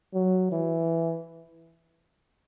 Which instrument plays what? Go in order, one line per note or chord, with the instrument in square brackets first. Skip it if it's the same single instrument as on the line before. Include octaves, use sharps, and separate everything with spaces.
[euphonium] F#3
E3